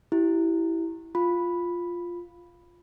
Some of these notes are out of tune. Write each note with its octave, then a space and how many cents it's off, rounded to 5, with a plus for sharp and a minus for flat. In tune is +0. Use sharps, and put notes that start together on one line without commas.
E4 +0 G4 -25
F4 +0 B5 +0